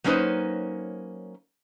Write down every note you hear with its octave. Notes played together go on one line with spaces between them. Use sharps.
F#3 A#3 C#4 D#4 B4 C5